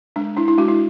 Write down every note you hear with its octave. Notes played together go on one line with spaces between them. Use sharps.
G#3 D4
D4 E4
E4
G#3 D4 F#4
E4